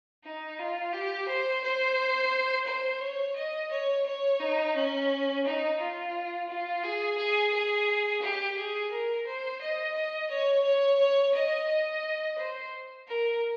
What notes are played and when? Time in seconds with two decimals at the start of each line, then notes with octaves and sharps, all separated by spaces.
0.24 D#4
0.59 F4
0.93 G4
1.28 C5
1.63 C5
2.67 C5
3.01 C#5
3.36 D#5
3.71 C#5
4.06 C#5
4.40 D#4
4.76 C#4
5.45 D#4
5.80 F4
6.49 F4
6.83 G#4
7.18 G#4
7.53 G#4
8.22 G4
8.57 G#4
8.91 A#4
9.26 C5
9.61 D#5
9.95 D#5
10.30 C#5
10.64 C#5
10.99 C#5
11.34 D#5
11.69 D#5
12.38 C5
13.08 A#4